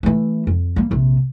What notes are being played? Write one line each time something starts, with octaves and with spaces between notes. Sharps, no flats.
E3 A3
F2
G3 A#3
A#1 C3